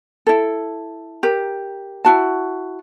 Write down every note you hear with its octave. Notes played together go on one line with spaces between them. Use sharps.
E4 A4
G4 A#4
E4 F#4 A5